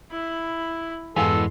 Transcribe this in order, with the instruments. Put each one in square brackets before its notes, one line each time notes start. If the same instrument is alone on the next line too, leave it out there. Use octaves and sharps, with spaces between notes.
[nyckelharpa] E4 B5
[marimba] F2 G#2 [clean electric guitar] E3 G#3 B3 [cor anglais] A4 [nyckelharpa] C6